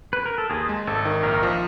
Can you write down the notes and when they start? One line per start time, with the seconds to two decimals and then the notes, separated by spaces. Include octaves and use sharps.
0.13 B4
0.26 A#4
0.38 A4
0.50 D#2 G#4
0.69 G#3
0.87 G#1 A4
1.05 D#3
1.23 A#1 A#4
1.43 F3